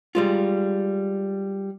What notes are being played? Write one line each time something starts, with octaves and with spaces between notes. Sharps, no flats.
G3 G#3 F4